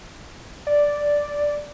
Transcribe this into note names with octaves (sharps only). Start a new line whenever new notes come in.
D5